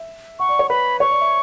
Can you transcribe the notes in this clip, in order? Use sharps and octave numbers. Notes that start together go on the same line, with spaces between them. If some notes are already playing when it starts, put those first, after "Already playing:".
Already playing: E5
F#5 C#6
D5
C#5
B4 B5
C#5 C#6
D5
E5